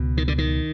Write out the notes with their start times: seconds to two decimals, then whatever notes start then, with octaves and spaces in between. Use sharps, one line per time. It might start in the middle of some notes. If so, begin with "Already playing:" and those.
Already playing: C#2 B2
0.17 D#3
0.28 D3
0.38 D#3